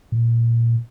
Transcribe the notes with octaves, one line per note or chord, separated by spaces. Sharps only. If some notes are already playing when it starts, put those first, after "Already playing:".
A#2